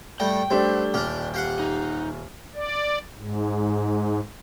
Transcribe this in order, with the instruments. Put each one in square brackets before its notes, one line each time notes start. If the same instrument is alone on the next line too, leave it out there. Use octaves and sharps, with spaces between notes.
[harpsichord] A2 G3 A3 [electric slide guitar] G5
[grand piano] G3 A3 D4 [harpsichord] C4
[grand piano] D#1 F6 [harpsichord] D4 G4
[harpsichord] G4 F5 F#5
[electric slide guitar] D#4
[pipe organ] D5
G#2